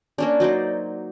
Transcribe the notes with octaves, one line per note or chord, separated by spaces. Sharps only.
A#3 C#4 D4
F#3 D#4 C5 D5